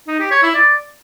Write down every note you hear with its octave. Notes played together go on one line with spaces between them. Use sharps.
D#4
G4
C#5
E4
D5